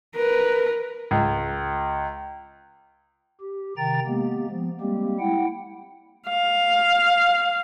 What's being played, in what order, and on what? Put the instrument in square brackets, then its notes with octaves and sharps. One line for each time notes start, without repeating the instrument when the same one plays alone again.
[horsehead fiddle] A#4 B4
[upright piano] C#2
[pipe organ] G4
C3 D#3 G5 A#5 A6
G#3 A#3 B3 G4
F3 B3
G3 G#3 A#3 C4 G4
E4 F#5 G5
[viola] F5